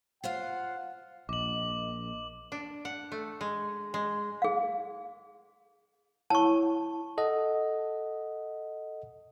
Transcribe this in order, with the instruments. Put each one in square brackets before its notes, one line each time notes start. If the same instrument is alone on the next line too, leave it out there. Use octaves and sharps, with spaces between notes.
[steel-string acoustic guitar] F4 C5 F5 [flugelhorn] F#5
[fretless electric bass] A#1 [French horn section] D#5 [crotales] D6 F#7
[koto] D4
F#5
A3
G#3
G#3
[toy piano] G#4 F5
[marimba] E4 C#5 [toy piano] A5 C#6
[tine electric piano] A4 D#5 F#5